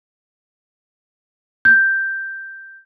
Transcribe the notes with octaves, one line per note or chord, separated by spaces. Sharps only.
G6